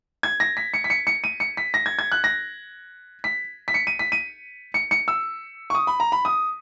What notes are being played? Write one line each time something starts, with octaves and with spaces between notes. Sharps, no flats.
G#6
A#6
B6
C#7
B6
C#7
C#7
D#7
C#7
B6
A#6
G#6
G#6
F#6
A#6
B6
B6
C#7
D#7
B6
D#7
C#7
C#7
E6
C#6
D#6
B5
A#5
B5
D#6